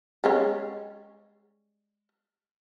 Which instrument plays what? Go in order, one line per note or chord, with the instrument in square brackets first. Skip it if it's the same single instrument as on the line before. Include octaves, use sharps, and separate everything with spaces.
[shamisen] G3 G#3 C#4